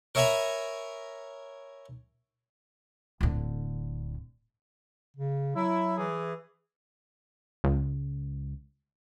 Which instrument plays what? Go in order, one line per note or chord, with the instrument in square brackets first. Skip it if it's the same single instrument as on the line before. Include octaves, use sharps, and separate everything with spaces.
[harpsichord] A#4 C#5 E5 G#5 A#5 B5
[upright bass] D1 D3
[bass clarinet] C#3
[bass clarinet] F#3 [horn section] E4
[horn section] E3 G#4
[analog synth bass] C#2